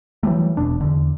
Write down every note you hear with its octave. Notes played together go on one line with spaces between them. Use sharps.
E3 F#3 G3 A3
E1 E2 B2 D4
E2 D3